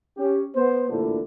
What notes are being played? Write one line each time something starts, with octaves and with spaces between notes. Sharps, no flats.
C#4 G4
B3 C5
A1 D2 A#2 D3 D4 E4